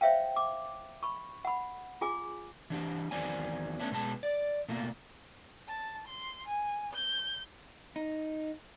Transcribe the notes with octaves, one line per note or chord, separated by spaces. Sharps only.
C5 C#5 E5 F5 G5
D6
B5 C#6
F#5 B5
F4 G#4 G#5 D6
E3 D4 G4
E2 D#3 F#3 C4 D5 G#5
A3 B3 C#4 D4 E4
B2 G#3 B4 A5
D5
B2 A3 A#3 F4
A5
C6
G#5
G6
D#4